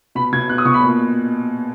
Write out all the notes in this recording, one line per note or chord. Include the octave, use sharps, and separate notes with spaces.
B2 B5
B2 G#6
B2 F#6
D#6
B2 C#6
B5
A#2